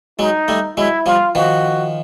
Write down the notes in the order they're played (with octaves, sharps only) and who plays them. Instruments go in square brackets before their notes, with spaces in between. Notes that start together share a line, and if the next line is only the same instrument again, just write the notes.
[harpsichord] F#3 G#3 [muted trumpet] D#4
[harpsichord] G3 A3
[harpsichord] F#3 G#3 [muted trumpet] E4
[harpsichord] F3 G3 [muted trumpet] F4
[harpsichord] D#3 F3 [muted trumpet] F#4